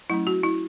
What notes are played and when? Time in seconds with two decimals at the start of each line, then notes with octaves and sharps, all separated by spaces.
0.10 F#3 A3 C#4 E4
0.27 F#4
0.43 E4